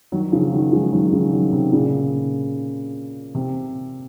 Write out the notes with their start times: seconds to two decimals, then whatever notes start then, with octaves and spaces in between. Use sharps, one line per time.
0.12 D#3 F#3
0.32 C#3 F3
0.52 D#3 F#3
0.72 F3 G#3
0.93 D#3 F#3
1.12 C#3 F3
1.33 D#3 F#3
1.52 C3 D#3
1.72 A#2 C#3
3.35 C3